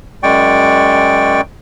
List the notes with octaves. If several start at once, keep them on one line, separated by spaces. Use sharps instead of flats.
F#2 G#3 D5 G5 C#6